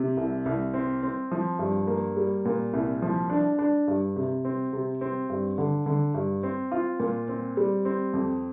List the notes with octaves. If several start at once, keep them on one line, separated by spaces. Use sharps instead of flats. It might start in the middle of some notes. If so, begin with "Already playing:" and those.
Already playing: C3
C2
C2
C4
C4
F3
G2
A#3
G3
A#2
C2
F3
D4
D4
G2
C3
C4
C3
C4
G2
D3
D3
G2
C4
F4
A#2
C4
G3
C4
F2